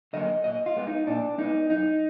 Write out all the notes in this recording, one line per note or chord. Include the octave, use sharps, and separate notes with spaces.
D3 F#3 A#3 D#5
A#2 D#5
F4
G#3 B3
D#4
A#2 D4
G#3 B3 D#4
F#2 D#4